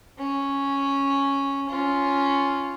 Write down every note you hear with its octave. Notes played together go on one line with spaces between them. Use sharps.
C#4
C#4 F4